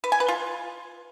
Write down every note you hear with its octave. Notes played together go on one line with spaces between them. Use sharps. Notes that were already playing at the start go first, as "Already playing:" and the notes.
B4
G#5
B4
F4